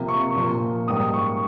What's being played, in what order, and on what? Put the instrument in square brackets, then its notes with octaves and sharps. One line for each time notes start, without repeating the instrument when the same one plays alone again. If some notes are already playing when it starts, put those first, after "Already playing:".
Already playing: [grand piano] C3 F3 A#3
C#6
A#2 F3 A#3
G#2 G3 A#3 D#6
C#6